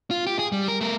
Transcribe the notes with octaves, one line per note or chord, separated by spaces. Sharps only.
F4
G4
G#4
G3
A#4
A3 A#4